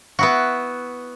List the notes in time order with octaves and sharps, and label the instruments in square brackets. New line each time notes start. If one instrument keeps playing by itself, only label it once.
[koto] B3 E4 F#4